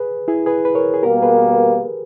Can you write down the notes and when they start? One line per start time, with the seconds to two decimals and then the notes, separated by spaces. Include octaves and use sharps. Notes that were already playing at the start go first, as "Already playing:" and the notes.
Already playing: G#4 B4
0.28 E4 G#4
0.46 G#4 B4
0.65 B4
0.75 A#4 C#5
0.94 G#4
1.03 B2 G3 A#3 G4 A#4
1.22 G#4 B4